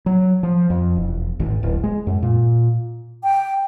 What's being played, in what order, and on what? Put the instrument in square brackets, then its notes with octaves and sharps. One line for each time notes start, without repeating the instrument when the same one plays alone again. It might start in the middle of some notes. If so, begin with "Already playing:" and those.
[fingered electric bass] F#3
F3
F2
E1
G#1
D1
G#3
F#2
A#2
[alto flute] G5